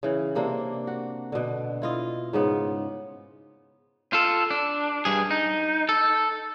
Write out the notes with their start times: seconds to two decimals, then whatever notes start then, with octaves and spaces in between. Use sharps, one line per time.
0.03 C#3 E3
0.35 C3 A#3 D4
0.87 F#4
1.32 B2 D3
1.82 E4 F4 D#5
2.33 G#2 C#3 B3
4.13 F4 A4
4.51 D4
5.05 G2 G#4
5.31 D#4
5.89 A4